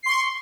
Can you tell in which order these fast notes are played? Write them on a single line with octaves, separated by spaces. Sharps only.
C7 C6 C#6